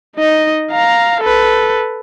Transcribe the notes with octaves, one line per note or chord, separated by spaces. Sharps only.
D#4 D#5
F5 A#5
A4 B4